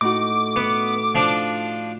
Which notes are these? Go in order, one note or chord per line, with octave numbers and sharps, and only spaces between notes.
A2 D#4 F#4 D6
B3
F3 D4